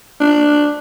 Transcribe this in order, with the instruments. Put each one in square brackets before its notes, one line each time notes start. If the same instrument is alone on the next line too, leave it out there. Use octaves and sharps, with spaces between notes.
[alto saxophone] D4